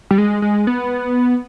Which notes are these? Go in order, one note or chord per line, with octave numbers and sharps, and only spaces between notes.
G3
G#3
G#3
B3